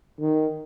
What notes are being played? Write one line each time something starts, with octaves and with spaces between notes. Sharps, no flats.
D#3